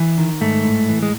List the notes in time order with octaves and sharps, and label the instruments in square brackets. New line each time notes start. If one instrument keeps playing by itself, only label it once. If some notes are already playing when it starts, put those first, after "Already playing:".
Already playing: [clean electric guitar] E3
D#3
G#2 A3
A2
E3
G#3